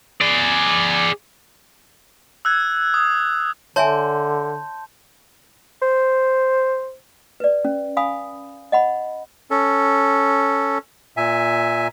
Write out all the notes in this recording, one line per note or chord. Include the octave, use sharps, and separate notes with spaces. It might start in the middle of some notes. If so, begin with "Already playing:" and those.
G#4 D5
E6 F#6 G#6
D#6
D3 C#5 E5 G#5 A5 C6 G6
C5
B4 D5
C#4
F5 G#5 B5 D#6
D#5 F#5 B5
C#4 A4
A#2 E5 G#5